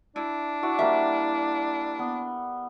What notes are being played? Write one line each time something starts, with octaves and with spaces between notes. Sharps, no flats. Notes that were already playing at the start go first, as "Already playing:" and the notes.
D4 E4
E4 F#4 D5
G3 A#3 B4 E5
B3